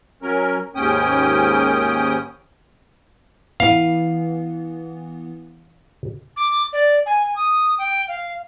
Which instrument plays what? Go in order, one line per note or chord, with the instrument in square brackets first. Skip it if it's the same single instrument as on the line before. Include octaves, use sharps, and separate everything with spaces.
[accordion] F#3 C#4 A#4
D#2 G#2 C#4 G5 D#6
[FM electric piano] E3 B3 [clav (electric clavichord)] F5
[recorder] D6
D5
G#5
D#6
G5
F5